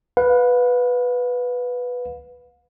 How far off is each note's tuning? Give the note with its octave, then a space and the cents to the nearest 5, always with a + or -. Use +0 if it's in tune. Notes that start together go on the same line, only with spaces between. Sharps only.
B4 +0 F5 +40